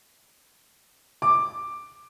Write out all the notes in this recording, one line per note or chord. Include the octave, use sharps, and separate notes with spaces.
D6